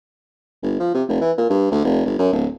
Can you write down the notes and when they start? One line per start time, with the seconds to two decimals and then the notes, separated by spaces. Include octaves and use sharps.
0.62 G1
0.80 F3
0.94 C3
1.09 F1
1.21 E3
1.38 A#2
1.50 G2
1.72 D2
1.84 F1
2.05 G1
2.19 F#2
2.33 D1